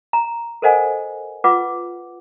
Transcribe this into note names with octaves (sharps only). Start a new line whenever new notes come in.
A#5
A4 A#4 C5 D#5 F#5 G#5
F4 B4 F#5 D6